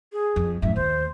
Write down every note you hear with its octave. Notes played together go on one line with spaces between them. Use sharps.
G#4
F2
F#2 A2 E5
D#2 C5